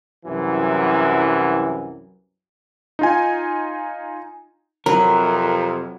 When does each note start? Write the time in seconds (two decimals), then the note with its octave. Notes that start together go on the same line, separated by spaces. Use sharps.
0.25 C2 F#2 E3 F#3
2.99 D#4 F4 G#5
4.86 F2 C3 F#3 A#4 B4